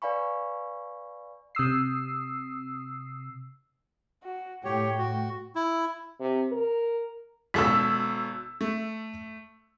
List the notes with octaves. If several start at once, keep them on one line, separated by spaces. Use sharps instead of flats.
B4 D5 F5 G#5 B5 C#6
C3 D#6 E6 C7
F#4
A2 G4 C#5 G5
F#4
E4
C3
A#4
G#1 B2 A4 E6 B6
A3